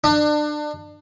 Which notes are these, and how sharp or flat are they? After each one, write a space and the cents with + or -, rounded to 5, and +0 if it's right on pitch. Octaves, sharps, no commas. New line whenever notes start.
D4 +30